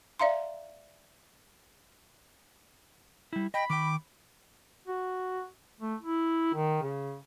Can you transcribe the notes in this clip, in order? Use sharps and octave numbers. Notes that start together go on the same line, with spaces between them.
D5 E5 F5 A#5 C6
G3 E4
D#5 G5 B5
D#3 G5 D6
F#4
A3
E4
D#3
C#3